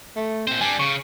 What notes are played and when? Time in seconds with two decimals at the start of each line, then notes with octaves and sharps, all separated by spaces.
0.16 A3
0.47 A#2 C4 C5
0.61 G3 D4 G#5
0.79 C#3 C#6